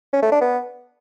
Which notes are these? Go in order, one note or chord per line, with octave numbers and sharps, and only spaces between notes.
C#4
A3
D4
B3